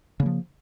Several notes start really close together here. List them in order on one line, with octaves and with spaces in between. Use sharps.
C#3 A#3 F3